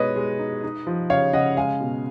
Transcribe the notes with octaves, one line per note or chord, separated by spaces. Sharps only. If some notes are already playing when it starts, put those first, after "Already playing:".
Already playing: B2 G#3 D#4 B4 C#5 D#5
G#3
D#4
D#4
F3
C#3 C#5 F5
C#3 D#5 F#5
G#3 F5 G#5
B2